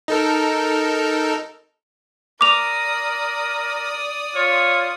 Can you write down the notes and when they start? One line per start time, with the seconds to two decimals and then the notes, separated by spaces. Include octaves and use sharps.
0.08 D#4 A4 A#4
2.41 A#4 D5 D6 D#6 F7
4.36 F4 C#5